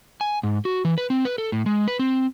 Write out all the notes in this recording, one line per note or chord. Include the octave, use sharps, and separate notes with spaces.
G#5
G#2
F#4
E3
B4
C4
B4
A4
A2
G#3
B4
C4